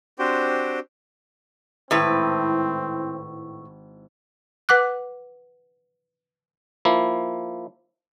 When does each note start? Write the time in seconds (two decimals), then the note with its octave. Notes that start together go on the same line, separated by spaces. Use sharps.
0.19 C4 D4 F#4 G4 C5 G5
1.91 G#1 A2 C4 E4 B4
4.69 B4 F#5 D6 F#6
6.85 F3 A#3 E4